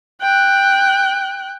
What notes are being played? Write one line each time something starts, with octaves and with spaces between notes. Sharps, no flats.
G5 F#6